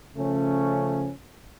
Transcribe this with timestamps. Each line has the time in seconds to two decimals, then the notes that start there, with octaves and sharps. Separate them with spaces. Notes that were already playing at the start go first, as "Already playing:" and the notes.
0.15 C#3 F3 A3 C#4